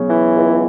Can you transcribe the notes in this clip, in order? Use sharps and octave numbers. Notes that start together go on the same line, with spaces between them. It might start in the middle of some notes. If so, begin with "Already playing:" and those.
Already playing: C#3 F#3 B3
E3
C#2